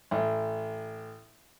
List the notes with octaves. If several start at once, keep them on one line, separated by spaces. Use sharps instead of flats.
A1